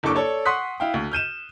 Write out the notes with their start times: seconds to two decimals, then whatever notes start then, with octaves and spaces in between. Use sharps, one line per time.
0.03 F#1 E2 D4 A4 C#6 D6
0.15 A4 C#5 D5
0.45 F#5 C6 C#6 D#6 F#6 B6
0.80 E4 F5 G5
0.94 D2
1.12 F6 G6 D#7 E7